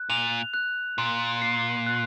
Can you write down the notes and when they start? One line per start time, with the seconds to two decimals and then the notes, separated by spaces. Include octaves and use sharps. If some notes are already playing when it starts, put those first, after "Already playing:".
Already playing: F#6
0.09 A#2 F7
0.54 F#6
0.98 A#2 C6
1.42 C7
1.87 F#6